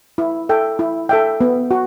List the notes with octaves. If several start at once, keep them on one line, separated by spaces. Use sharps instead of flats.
E4
A4 E5 G5
E4
A4 E5 G5
B3
F#4